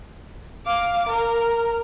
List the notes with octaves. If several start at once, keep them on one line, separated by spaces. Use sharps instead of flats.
F5 D6
A#4